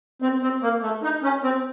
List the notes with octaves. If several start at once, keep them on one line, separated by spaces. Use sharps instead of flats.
C4
C4
A#3
A3
D#4
C#4
C4